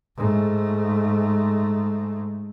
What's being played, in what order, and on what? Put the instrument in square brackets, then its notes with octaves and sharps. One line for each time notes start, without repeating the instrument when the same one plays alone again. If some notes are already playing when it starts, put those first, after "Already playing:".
[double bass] G#2 A3